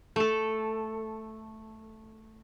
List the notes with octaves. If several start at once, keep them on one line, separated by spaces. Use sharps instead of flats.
A3 A4